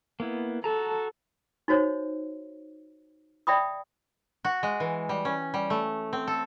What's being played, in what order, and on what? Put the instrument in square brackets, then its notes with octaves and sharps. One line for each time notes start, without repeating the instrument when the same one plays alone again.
[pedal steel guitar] A#3 B3 E4
[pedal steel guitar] F#4 A5 A#5 [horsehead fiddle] A4
[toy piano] D#4 F#4 C5 C#5
D5 E5 G5 B5 D#6
[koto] F#4
G#3
E3
G3
C#4
G3
A3
C4
A4